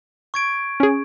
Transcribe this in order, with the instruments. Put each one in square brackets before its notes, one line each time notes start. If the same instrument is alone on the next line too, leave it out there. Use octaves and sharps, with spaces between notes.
[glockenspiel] C#6 G#6 D7
[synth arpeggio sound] C#4 G#4